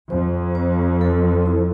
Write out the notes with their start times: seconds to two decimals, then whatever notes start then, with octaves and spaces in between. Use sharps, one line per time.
0.10 F2 C5
0.55 C5
1.01 A4
1.46 E4